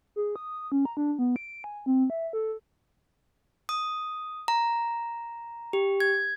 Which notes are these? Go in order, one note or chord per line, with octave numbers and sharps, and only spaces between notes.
G#4
D#6
C#4
A#5
D4
B3
D7
G#5
C4
E5
A4
D#6
A#5
G4
G#6